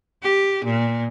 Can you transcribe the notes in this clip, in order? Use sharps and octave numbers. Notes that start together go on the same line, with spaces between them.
G4
A#2